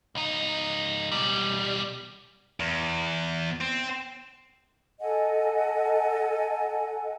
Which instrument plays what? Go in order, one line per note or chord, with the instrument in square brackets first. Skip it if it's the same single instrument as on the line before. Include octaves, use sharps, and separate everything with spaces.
[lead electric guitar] C#2 D#4
B1 G3
[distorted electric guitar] E2
C4
[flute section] A4 D#5 F#5 G#5